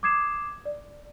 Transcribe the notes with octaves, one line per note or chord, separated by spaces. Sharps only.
D6 D#6 G#6 C7 E7
D5